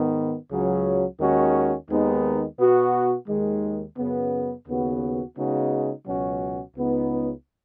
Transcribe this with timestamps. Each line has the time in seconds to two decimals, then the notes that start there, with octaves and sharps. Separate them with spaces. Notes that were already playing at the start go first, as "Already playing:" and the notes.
Already playing: G#2 D#3 B3
0.50 C#2 C#3 F#3 C#4
1.20 D#2 D#3 G#3 C#4 F#4
1.90 D#2 D#3 G#3 B3 D#4
2.58 B2 B3 F#4
3.28 D#2 D#3 G#3
3.98 F#2 C#3 B3
4.67 D#2 C#3 B3 F#4
5.37 C#3 G#3 B3 D#4 F#4
6.07 C#2 B2 F#3 C#4 F#4
6.76 C#2 C#3 B3 D#4